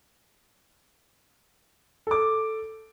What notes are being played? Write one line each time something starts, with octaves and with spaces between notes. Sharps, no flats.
A4 D6